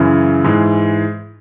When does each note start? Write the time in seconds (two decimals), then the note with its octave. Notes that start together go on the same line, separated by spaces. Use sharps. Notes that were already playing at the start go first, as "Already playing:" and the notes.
Already playing: F#2 C#3 E3
0.44 G#2 E3 G#3